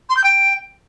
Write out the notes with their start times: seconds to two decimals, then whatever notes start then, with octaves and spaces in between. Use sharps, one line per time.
0.09 C6
0.17 G6
0.24 G5